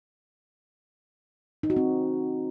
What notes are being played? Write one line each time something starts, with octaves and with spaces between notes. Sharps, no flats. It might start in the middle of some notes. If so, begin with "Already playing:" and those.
D#4
F#4
C4